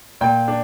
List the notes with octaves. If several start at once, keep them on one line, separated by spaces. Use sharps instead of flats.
A#2 G5
D4